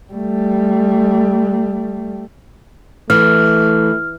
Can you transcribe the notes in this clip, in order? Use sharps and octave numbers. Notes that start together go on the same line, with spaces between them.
G3 A3
E3 A3 F6